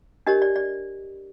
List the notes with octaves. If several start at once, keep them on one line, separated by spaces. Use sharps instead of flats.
D4 G4 A#4 C#5 D#5
D5
D5